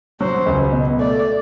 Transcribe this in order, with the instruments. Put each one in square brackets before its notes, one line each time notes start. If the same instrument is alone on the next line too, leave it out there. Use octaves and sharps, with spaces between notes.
[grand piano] F#3 [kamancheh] C5
[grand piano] C#2
B2
[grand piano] A3 [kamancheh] D5